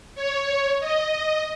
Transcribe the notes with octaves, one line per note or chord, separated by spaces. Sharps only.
C#5
D#5